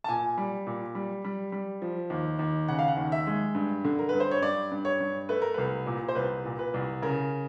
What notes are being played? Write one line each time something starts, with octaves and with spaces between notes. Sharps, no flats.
A5
A#2 G#5
G3
A#2
G3
G3
G3
F3
D#2
D#2
C#3 F#5
F5
F#5
D#2
E5
G#3
G2
D3
A#4
G2 B4
C5
C#5
G2 D5
G2
C#5
G2
A3 B4
A#4
C2 B4
A#2
C5
C2 B4
A#2
B4
C2
C#3 A#4